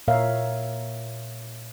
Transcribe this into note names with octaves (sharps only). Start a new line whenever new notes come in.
A#2 A#4 C#5 E5 F5